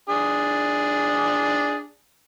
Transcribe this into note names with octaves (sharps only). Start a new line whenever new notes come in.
D4 G#4